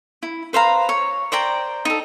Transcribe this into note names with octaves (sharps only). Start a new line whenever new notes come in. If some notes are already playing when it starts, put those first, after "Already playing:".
E4
B4 C5 F5 A#5
C#5
C5 D5 G5 A#5
D#4 A4